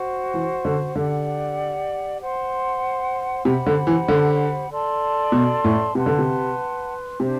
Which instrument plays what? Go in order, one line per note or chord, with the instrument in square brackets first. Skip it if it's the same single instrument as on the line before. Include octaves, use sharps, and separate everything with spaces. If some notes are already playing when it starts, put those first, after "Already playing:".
Already playing: [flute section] F#4 C5 F#5
[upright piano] E3
D3
[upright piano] D3 [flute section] G4 D5 F#5
[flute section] C5 F#5 C6
[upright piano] C3 [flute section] G4 C5 F#5 B5
[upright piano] D3
E3
D3
[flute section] A4 D5 A5 C6
[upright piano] B2
A2
[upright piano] C3 [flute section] B4 F#5 A5 C6
[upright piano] D3
C3
[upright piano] C3 [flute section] D4 G4 C5